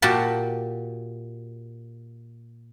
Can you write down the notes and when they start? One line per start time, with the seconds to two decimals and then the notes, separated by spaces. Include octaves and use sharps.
0.02 A#2 F#4 G4 A5